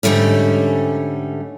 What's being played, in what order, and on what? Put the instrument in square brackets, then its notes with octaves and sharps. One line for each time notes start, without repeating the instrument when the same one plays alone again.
[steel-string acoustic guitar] G#2 D3 G3 A3 C#4